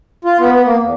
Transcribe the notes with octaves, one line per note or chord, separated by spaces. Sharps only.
F4
B3
B3
A#3
E2